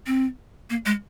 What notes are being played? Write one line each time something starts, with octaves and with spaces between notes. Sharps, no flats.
C4
A#3
G#3